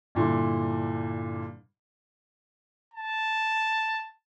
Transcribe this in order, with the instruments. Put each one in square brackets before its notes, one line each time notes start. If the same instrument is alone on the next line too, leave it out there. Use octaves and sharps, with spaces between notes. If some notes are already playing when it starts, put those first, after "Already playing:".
[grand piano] G2 A#2 D3 E4
[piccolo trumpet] A5